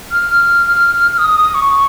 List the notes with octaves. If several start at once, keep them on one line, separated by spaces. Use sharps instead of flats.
F6
D#6
C#6